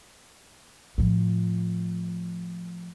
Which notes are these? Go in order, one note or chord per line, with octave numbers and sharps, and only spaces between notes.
A2 F3